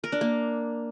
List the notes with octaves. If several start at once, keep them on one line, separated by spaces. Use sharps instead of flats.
A#4
D4
A#3